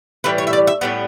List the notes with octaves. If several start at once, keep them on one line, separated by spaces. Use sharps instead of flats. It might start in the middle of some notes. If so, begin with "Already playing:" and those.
A2 E3 G3 B4
C#5
E5
D5
E5
A2 E3 G3 B3 D5